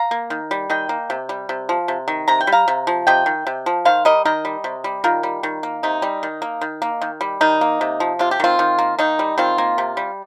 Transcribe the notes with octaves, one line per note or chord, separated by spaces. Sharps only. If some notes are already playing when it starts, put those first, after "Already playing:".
Already playing: F5 A#5
A#3
D#3
G3
D#3 D#5 G5
A#3
C3
G3
C3
F3
C3
D#3
C3 A#5
G5
G3
F5 A#5
C3
F3
C3 D#5 G5
D#3
C3
F3
D#3 C5 F5
G3 A#4 D#5
D#3 A#4 D#5
G3
C3
G3
D#3 F4 A#4
G3
D#3
A#3
C3 D#4
G3
D#3
A#3
D#3
A#3
D#3
G3
D#3 D#4
A#3
C3
F3
C3 F4
G4
D#3 C4 F4
D#3
A#3
D#3 D#4
G3
D#3 C4 F4
A#3
C3
G3